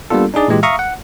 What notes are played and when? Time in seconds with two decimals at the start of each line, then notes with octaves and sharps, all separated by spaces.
0.10 G3 A#3 B3 D4 F4 A4
0.34 D4 D#4 G#4 D5
0.48 A#2 E3 G#3 G4
0.63 E5 F5 A#5 C#6 D#6
0.79 F#5